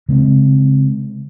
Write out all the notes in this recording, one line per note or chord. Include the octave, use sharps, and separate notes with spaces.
C#3 G#3 C4